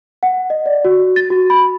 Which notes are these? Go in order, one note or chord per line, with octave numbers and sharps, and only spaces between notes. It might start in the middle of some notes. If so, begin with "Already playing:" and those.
F#5
D#5
D5
F#4
A6
F#4
B5